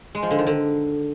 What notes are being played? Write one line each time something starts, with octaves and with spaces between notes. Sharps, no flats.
G#3
F3
D3
D#3
D3